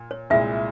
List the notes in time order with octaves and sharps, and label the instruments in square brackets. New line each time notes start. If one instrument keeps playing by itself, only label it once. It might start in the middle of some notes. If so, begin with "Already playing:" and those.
Already playing: [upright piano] A#2
[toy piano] C#5
[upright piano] C2 A#2 G#3 E4 [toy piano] E5